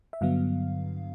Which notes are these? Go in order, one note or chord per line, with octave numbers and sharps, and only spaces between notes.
E5
G2 D3 F#3 B3 F5